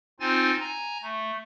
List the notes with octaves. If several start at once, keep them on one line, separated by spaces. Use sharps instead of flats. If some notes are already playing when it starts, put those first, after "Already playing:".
C4 D#4 F4 C5 G#5 A6
G#5 A#5
A3